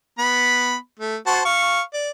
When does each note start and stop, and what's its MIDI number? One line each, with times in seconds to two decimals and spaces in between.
0.19 0.76 59
0.19 0.76 83
0.99 1.16 57
1.27 1.41 66
1.27 1.41 72
1.27 1.41 81
1.45 1.81 77
1.45 1.81 85
1.94 2.10 74